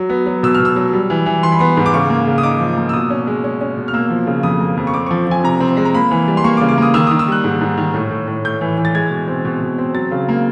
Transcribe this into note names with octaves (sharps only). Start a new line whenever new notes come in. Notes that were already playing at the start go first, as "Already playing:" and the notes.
Already playing: F#3
B3
F#3
B2 E6
F6
B2
E6
F#3
G3
E3
E3
E3 C6
B5
B3 C6
G#2
D6
C#3 C#6
A#3
C#3
D#6
D#4 D6
F3
A#3
E6
B2 D#6
C#4
G#3
C#4
C#4
B2
F6
A#3 E6
F3
C#3
F2 D#6
A#3
F2
C#6
C4 D6
F3 C#6
F3 G#5
C3 A#5
C4
G#3
A#5
A#3 B5
E3
G3
C6
A#3 C#6
D6
C#3
D6
A#3 D#6
D#3 E6
D#3 D#6
E6
G3 F#6
G#2
G#2
D#3
A2
A2
A2
A2 G6
E3
E3
A6
G#3 G#6
B2
C4
B2
B2
C4
F#3 A6
C#3
A#3